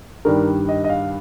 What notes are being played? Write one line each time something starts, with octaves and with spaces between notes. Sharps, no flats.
G2 D#3 G3 A#4
D#5
D#5
F5